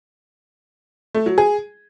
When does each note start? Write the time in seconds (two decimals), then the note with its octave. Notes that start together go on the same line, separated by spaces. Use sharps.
1.15 A3
1.26 F#3
1.38 G#4